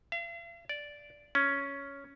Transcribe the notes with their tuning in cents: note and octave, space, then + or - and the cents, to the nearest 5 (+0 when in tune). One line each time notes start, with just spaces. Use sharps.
F5 -45
D5 -5
C#4 +5